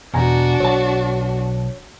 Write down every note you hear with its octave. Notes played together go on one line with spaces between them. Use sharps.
E2 B2 D4 F#4 G#5 A#5
B1 C#5 A5